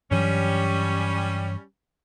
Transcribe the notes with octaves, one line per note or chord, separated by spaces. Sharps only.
G2 E3 F#3 G3 C#4